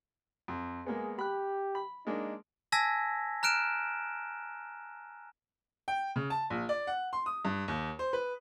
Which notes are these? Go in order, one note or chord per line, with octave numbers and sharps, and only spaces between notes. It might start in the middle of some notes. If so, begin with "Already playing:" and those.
F2
G#3 A#3 B3 G#4
G4 B5 F#6
B5
G#3 A#3 D4 D#4
G#5 A5 E6 G#6 A#6 B6
A#5 F6 F#6 D7 E7
G5
C#3
A5
A#1
D5
F#5
C6
D#6
G2
D#2
C5
B4